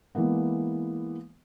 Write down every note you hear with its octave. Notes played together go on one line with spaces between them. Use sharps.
E3 G#3 A#3 B3